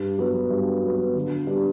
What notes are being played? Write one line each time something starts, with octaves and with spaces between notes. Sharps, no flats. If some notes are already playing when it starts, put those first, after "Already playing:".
Already playing: G2
F#3 B3
G2
F#3 B3
D3
G3 B3 D4